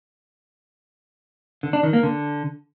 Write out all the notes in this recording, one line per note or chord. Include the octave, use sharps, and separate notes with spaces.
D3
D4
D#3
A#3
D3